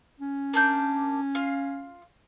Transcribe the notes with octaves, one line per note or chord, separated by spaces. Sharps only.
C#4
A#3 D4 G6
F4 F5